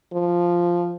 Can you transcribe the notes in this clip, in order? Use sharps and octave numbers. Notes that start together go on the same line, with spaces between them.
F3